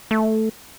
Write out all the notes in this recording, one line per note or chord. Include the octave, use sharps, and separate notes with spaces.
A3